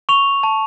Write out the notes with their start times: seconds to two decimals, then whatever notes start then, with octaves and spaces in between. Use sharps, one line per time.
0.09 C#6 F7
0.43 A5